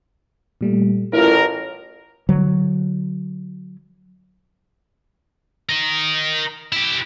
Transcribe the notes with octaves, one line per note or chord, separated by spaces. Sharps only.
A#2 G3 A3
A1 E4 F4 A#4
D3 F#3
A#4 D#5
E4 G4